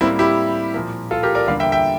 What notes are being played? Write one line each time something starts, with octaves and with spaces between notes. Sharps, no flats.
A2 G3 A#3 C4 E4
E4 G4
A#2 F3 A#3
F4 A4
G4 A#4
A#4 D5
E2 D3 G3 A#3 D5 F5
E5 G5
E5 G5